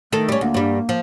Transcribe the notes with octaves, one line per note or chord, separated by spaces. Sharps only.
D#3 A3 A4
G3 C#4
D2 A#3
G2 G3
F3